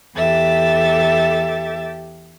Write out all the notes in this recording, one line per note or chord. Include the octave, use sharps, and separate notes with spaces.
E2 G4 A4 E5 A6